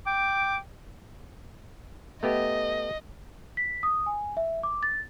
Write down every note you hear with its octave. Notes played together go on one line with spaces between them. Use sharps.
G5 D6
A3 B3 G4 D#5
B6
D#6
G#5
E5
D6
A6